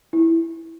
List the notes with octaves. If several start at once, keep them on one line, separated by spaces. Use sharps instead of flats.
E4